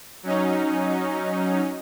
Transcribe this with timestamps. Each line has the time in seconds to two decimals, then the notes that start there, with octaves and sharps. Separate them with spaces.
0.23 F#3 C#4 D#4